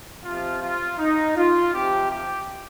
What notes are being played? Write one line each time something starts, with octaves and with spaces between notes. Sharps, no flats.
C3 F3 F4
F4
D#4
F4
C3 F3 G4
G4